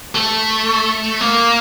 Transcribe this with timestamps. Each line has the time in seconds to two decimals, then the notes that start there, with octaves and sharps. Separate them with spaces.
0.15 A3
1.21 A#3